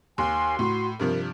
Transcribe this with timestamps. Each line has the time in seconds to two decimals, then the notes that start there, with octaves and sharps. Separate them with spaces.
0.18 D#2 G#5 C6
0.59 A2 F#4
1.00 G2 C3 F3 A#4